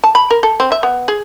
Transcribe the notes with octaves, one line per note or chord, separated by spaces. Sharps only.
A5
B5
A#4
A4
C4
E5
B3
G#4